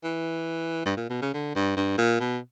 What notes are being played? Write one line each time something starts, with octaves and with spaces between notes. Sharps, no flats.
E3
G2
A#2
B2
C#3
D3
G2
G2
A#2
B2